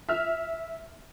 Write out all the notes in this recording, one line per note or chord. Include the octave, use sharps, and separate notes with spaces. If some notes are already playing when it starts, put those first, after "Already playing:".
E5 F6